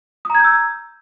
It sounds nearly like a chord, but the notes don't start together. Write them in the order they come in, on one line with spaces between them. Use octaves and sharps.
D#6 A#5 G#6 G6 E6